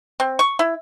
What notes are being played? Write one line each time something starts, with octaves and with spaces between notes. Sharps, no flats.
C4
C#6
E4